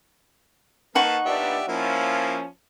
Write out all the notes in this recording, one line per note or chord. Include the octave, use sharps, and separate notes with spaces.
A#3 D#4 B4 F#5 A5 C#6
A#2 B3 D4 G4 D5 E5
F3 A#3 C#4 E4